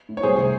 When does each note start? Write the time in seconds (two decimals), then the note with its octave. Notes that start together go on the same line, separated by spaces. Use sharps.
0.09 A2
0.17 C#5
0.23 C2 G#4 C5
0.38 C3